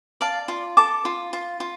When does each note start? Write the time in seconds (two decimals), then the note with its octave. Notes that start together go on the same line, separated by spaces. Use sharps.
0.21 D5 F5 A5
0.48 F4
0.77 A4 A5 D6
1.05 F4
1.33 F4
1.60 F4